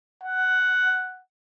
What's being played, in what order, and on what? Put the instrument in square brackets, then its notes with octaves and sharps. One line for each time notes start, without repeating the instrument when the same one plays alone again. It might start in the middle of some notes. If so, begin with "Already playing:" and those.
[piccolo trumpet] F#5